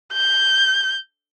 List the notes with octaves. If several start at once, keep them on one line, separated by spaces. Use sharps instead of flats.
G6